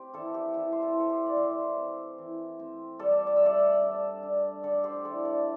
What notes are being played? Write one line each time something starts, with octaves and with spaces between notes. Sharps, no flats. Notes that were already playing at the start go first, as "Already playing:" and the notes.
Already playing: C4 G4
E3 E4 A4
G4
E3 E4
C5
E4 A4
E3 A4
G4 C5
D5
E3 C5 E5
C4
E3
C4
G3 A4 D5
D5
E5
G3 A4 D5
D4
D4
D3 A4 D5
G4 C5
D3 E4 A4
A4 D5